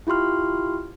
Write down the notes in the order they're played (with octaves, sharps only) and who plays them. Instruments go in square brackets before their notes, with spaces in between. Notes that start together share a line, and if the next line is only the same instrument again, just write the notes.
[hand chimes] E4 F4 G4 C6 F6